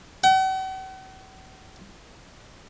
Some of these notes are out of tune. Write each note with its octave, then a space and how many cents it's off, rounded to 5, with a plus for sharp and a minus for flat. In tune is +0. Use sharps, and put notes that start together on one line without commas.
F#5 +45